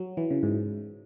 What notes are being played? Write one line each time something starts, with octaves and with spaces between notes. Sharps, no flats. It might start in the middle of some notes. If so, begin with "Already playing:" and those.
Already playing: F#3
E3
C#3
G#2